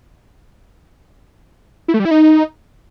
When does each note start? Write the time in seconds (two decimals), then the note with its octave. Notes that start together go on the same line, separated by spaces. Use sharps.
1.88 E4
1.94 A3
2.00 G3
2.05 E4
2.11 D#4